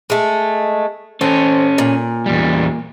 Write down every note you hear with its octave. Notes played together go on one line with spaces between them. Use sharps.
G#3 A3
C4 C#4 A4
A#2
E2 G3